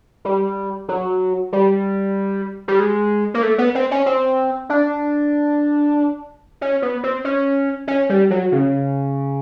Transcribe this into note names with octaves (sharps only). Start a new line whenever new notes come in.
G3
F#3
G3
G3
G#3
A#3
A3
B3
C4
C#4
C4
D4
C#4
B3
C4
C#4
C#4
G3
F#3
C#3